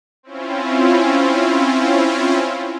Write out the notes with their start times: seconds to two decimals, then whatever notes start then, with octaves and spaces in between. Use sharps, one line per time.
0.23 C4 C#4 E4 F4